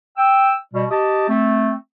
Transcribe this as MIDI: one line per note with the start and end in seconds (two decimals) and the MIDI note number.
0.16 0.53 79
0.16 0.53 88
0.74 0.85 47
0.74 0.85 55
0.90 1.27 67
0.90 1.27 75
0.90 1.27 81
1.29 1.73 57
1.29 1.73 60